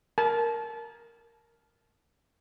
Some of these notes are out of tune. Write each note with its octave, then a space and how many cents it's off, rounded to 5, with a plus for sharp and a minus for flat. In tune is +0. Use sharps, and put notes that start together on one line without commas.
A#4 +0 A5 -25